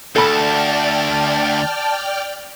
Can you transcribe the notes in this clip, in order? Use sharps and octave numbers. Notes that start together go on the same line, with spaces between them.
D2 A4 D5 G5 A5 B5 F6